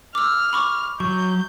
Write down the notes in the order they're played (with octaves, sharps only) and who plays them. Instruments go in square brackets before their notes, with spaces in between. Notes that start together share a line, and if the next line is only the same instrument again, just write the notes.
[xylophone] D6 E6 [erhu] F6
[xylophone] B5 C#6 D6
[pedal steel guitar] F#3 [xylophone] C#6 [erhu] G6